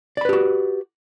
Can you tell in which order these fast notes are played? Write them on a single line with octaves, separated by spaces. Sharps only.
D5 B5 B4 G4 F#4